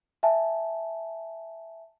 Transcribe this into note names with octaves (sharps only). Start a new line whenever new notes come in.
E5 G#5 A5